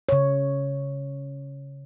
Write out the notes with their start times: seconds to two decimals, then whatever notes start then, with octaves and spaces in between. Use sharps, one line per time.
0.09 C#3 C#5